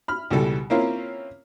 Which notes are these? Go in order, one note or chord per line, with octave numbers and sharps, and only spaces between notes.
B5 F6
C#2 B2 E3 G3 A4
A#3 C4 C#4 E4 F4 A#4